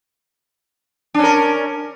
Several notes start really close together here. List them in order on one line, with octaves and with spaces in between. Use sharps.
D4 C#4 A#4